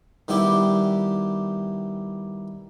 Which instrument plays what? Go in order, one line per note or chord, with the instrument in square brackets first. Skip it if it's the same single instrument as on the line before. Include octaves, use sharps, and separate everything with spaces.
[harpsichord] D#3 G3 B3 E4 G4